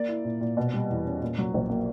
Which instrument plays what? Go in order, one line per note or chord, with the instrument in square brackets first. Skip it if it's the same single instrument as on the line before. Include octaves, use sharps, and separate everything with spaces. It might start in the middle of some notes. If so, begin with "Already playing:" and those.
Already playing: [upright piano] A#3 D5
E4
A#2
A#2
B2
G3
E2
C#4
A#2
F#3
A#1
A#3